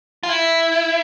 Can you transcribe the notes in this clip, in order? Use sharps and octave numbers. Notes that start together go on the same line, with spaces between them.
F4
E4